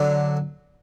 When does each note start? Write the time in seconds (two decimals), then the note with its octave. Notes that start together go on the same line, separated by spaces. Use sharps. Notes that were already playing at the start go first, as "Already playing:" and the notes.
Already playing: D3 F#3